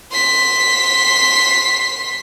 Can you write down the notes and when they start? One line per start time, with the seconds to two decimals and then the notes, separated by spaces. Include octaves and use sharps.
0.12 C6 B6